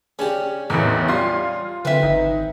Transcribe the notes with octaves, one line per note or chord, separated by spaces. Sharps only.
C#3 C#4 D4 G4
A1 E2 D#3
G3 F4 C6
D3 E3 C4 B4 E5
G#1 D#4